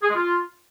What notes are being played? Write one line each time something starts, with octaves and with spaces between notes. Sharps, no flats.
G#4
G#3
F4